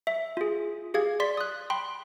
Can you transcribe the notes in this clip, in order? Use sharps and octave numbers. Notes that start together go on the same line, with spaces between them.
E5
F4 G#4
G4 G#4 F5 G#6
D5 C6 B6
D#6 F#6
G5 B5 C6